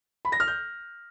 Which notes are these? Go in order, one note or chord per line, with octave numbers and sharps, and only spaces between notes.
B5
A#6
F6
G6